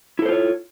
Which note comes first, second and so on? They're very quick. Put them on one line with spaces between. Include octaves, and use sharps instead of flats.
E4 A4 C5 F4 C#5